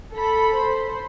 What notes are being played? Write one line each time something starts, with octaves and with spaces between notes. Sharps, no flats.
A4 B5
C5